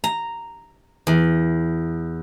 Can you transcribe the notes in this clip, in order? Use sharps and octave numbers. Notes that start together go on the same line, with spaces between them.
A#5
E2